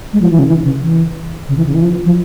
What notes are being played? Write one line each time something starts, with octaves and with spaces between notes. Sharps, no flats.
G#3
F3
E3
C#3
E3
C#3
E3
C#3
E3
C#3
E3
F3
F3